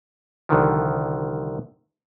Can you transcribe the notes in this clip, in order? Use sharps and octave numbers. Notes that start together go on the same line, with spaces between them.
C2 D3 D#3 F3